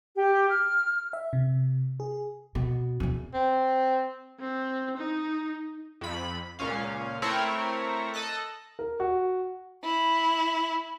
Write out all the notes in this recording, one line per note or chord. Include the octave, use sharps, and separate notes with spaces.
G4
F6
E5
C3
G#4
B2
E2 B2
C4
C4
D#4
F2 B5
C#2 A#2 C#4 F5
A3 C4 E4 A#4 C#5
A4 D#5 A5 F#6
A#4
F#4
E4